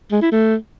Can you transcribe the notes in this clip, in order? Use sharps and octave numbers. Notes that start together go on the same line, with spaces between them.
G#3
E4
A3